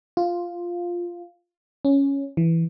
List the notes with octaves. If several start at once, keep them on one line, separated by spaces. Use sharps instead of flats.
F4
C#4
E3